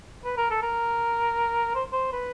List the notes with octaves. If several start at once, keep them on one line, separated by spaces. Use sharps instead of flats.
B4
A#4
A4
A#4
C5
C5
B4